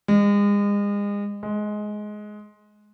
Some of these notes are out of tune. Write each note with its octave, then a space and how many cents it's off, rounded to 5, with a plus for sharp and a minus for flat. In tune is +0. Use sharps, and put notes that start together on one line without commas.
G#3 -35
G#3 +15